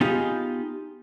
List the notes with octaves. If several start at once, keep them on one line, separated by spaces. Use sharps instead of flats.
B3 D#4 F4 G4 G#4